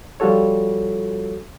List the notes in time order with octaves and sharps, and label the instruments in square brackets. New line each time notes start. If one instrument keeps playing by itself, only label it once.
[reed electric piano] F3 G3 F4 F#4 A4 C#5